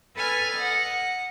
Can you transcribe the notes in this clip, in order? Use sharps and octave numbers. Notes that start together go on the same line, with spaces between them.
A4 B4 G#5 F6
D#5 F#5